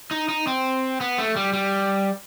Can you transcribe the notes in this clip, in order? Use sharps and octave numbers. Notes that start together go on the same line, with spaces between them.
D#4
D#4
C4
B3
A3
G3
G3